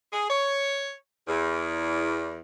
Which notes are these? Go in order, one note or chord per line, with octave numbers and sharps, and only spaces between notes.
G#4
C#5
E2